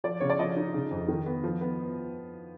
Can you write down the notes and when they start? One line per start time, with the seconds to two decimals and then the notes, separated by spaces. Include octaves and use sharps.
0.04 F3 D5
0.20 C#3 C#5
0.30 D5
0.39 F3 D#5
0.56 D#4
0.74 C#3
0.91 F2
1.08 D#3
1.26 B3
1.43 F3
1.61 B3